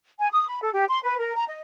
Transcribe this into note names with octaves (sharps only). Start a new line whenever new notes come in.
G#5
D#6
B5
A4
G4
C6
B4
A#4
A#5
D#5